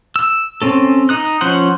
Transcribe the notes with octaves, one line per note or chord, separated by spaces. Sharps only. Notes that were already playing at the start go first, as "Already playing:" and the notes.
E6
C4 C#4 A4
D#4 D#6 F#6
F3 C#4 C5 F#5